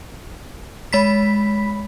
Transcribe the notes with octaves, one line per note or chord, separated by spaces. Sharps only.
G#3 B5 B6